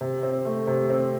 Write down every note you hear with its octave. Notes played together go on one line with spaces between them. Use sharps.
C3
C4
A3
C3
C4